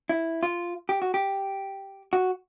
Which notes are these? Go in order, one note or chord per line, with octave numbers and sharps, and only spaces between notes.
E4
F4
G4
F#4
G4
F#4